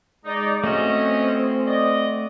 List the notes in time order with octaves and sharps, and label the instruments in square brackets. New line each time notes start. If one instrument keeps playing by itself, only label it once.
[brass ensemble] G#3 D5 [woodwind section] D#4
[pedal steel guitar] A3 F#4 [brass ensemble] C4 [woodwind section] C#4 D#5
[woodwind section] D5 D#5